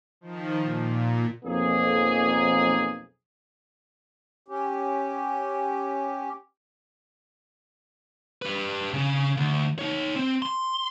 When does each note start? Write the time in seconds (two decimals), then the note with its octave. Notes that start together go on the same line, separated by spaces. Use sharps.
0.21 D#3 F3
0.60 A#2
1.44 B1 F2 A#3 G#4
4.48 C#4 G4
8.42 G4 B4
8.94 C#3 C#4
9.37 D2
9.79 D#4 C#5
10.16 C4
10.42 C6